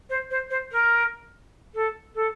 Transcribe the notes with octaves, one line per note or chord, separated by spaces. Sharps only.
C5
C5
C5
A#4
A4
A4